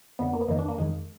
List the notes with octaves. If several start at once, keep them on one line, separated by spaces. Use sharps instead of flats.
F2 D3 B3
A#3
B3
F2 D#3 A#3
D4
A#3
F2 D#3 G#3